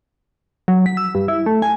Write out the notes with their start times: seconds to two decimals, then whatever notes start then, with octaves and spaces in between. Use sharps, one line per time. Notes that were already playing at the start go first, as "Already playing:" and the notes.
0.68 F#3
0.86 B6
0.97 E6
1.15 G2
1.28 E4
1.46 A3
1.62 G#5